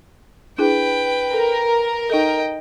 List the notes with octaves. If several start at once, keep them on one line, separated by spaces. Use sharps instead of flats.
D4 E4 G#4 B4 G5
A4 A#4
D#4 A4 D#5 G5